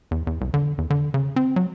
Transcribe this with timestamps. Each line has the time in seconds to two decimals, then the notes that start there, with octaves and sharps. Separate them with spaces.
0.11 E2
0.27 E2
0.41 C2
0.54 D3
0.78 E2
0.90 D3
1.14 C#3
1.36 C4
1.56 F#3